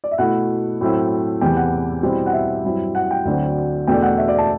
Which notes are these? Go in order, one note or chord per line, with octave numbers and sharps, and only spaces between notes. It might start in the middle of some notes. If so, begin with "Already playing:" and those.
D5
E5
B2 A3 E4 F#5
A2 F#3 A3 C4 E4
E2 C3 E3 G5
F#5
B2 G3 C4 E4
F#5
E5
G2 F#3 C4 E4
F#5
G5
D2 D3 F#3 C4
E2 B2 A3 D4 G5
F#5
E5
D5
A5